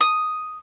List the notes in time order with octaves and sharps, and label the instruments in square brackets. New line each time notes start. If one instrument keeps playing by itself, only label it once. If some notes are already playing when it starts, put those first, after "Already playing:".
[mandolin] D#6